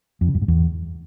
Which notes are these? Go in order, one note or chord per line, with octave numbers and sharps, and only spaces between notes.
F2
C#3
F#2
G#2
E2